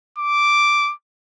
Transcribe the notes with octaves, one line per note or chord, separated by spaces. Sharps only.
D6